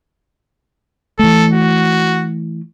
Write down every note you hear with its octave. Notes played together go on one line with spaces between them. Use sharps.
E3 A3 A4
F#4